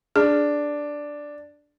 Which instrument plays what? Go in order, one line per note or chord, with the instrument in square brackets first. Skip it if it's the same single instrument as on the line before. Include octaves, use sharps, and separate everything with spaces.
[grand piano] D4 [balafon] G#4